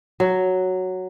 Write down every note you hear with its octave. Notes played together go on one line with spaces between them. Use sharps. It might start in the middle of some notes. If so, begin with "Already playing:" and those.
F#3